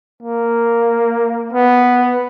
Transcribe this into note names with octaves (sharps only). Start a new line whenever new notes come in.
A#3
B3